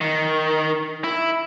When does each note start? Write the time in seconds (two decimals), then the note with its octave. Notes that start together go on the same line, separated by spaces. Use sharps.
0.01 D#3
1.04 E4